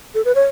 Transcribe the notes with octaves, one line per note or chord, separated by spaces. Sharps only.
A4
B4
C#5